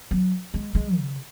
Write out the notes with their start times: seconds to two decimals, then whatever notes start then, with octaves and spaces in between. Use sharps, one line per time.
0.11 F#3
0.54 G#3
0.75 G#3
0.97 C#3